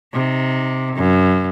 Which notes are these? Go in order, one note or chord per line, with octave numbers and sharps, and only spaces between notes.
C3 D#4
F#2